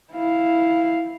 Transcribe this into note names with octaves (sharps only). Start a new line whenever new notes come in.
E4 F5